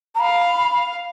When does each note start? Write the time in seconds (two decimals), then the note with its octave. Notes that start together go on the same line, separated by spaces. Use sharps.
0.15 A#5
0.20 F5 B5